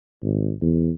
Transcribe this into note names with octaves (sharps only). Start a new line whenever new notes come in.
G#1
E2